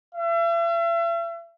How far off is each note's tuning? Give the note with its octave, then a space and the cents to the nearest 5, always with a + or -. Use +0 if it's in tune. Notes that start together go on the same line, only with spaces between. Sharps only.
E5 +40